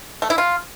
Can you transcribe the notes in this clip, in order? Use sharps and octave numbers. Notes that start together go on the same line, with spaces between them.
A3
E4
F4